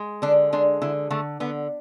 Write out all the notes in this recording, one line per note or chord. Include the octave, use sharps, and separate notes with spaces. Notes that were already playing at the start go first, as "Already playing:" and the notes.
Already playing: G#3
D3 D4
G#3 D4
D3 E4
D3 A3
D3 B3